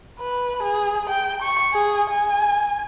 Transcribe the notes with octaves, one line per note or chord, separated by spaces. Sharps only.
B4
G#4
G5
C#6
G#4
G#5